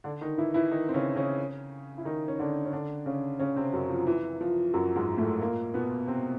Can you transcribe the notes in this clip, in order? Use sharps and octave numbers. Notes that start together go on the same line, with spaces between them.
D3 D4
D#3 D#4
E3 E4
E3 E4
D#3 D#4
C4
C#3 C#4
C#3 C#4
E4
D#3 D#4
C#4
D3 D4
C#4
D3 D4
C#3 C#4
C#3 C#4
C3 C4
F#2 F#3
F3
E3
F3
F#2 F#3
G#2 G#3
A2 A3
A#2 A#3
B2 B3
C3 C4